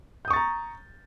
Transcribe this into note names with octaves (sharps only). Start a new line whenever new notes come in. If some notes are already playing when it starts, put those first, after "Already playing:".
A#5 C#6 D#6 G6 A6